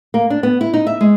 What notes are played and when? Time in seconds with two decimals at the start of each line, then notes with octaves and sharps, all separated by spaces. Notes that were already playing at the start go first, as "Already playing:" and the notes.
0.14 A#3
0.30 D4
0.43 B3
0.61 E4
0.74 D#4
0.87 E5
1.01 G#3